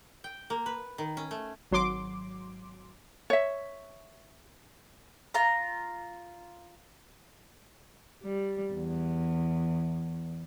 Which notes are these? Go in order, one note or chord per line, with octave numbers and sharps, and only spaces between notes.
G5
A#3
B4
D#3
C#4
A3
G#1 F#3 C6 D6
C#5 E5
F4 A#5
G3
E2